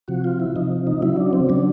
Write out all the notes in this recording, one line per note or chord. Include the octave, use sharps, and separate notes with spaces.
C3 F3 F#4
F4
E4
C3 F3 D#4
D#4
C#3 F#3 E4
D4
C4
C#3 F#3 D4